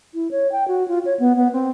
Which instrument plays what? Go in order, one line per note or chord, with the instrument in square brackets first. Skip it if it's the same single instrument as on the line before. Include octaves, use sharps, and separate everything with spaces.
[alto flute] E4
C#5
G5
F#4
F4
C#5
B3
B3
C4